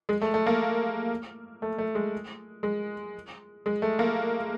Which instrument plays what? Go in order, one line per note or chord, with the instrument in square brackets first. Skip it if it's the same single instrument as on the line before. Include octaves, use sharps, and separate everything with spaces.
[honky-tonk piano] G#3
A3
A3
A#3
A3
A3
G#3
G#3
G#3
A3
A#3